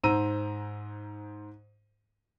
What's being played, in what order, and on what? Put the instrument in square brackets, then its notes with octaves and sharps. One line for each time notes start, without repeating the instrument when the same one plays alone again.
[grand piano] G#2 C5 A#5 E6 D#7